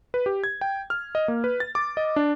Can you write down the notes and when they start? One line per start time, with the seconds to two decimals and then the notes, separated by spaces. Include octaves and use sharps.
0.14 B4
0.26 G4
0.44 G#6
0.61 G5
0.90 F6
1.15 D#5
1.28 A#3
1.44 B4
1.60 A6
1.75 D6
1.97 D#5
2.16 D4